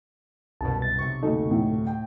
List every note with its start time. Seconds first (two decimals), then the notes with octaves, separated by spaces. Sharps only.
0.61 C2 F#2 B2 A5
0.82 A6
0.99 B1 C3 C#6
1.23 F#1 D2 D#4 A4
1.51 A2
1.87 G5